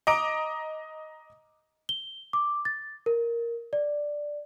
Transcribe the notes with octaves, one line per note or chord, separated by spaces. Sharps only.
D#5 A#5 D6 D7
G7
D6
A6
A#4
D5